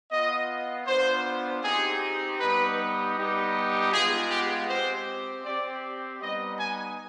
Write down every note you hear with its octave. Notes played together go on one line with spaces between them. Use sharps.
B3 F4 D#5
B3 D4 F4 C5
C4 D#4 G4 G#4
G3 B3 D#4 G4 B4
G3 B3 D#4 G4
G#3 B3 F4 G#4
G4
C4 G4 C5
C4 G4 D5
G3 B3 D#4 D#5
G#5